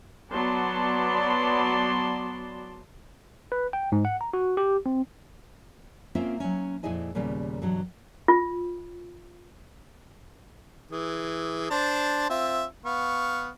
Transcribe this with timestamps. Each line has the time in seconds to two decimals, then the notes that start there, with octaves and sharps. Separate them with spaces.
0.32 F#3 B3 D5 A5 C6
3.52 B4
3.73 G5
3.92 G#2
4.05 F#5
4.21 A#5
4.33 F#4
4.57 G4
4.86 C4
6.15 A#3 C4 C#4 F4 A#4 E5
6.40 F#3 C#4
6.83 F2 A#2 E4 G#4 D#5 G#5
7.15 D#2 A#2 C#3 G3 A#3 B3
7.62 G2 B2 E3 F#3
8.28 F4
10.91 E3 G#4
11.71 D4 C5 A5
12.30 C4 F4 E5
12.85 B3 F5 C#6